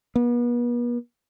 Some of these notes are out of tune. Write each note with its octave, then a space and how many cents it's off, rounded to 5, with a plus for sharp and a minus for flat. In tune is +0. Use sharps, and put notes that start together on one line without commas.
B3 -40